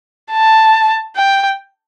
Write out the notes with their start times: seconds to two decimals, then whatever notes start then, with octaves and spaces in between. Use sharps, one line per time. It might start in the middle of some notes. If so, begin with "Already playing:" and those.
0.32 A5
1.16 G5